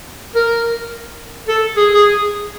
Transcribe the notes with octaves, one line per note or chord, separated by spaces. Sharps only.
A#4
A4
G#4
G#4